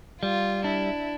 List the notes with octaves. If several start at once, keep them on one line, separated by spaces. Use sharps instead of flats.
G3 F4
D4 E4